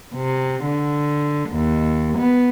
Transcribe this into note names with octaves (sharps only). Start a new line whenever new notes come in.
C3
D3
D#2
B3